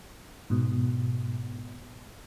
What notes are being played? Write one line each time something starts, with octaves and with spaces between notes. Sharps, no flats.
G#2 B2